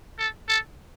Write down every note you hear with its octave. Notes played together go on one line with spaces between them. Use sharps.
A4
A4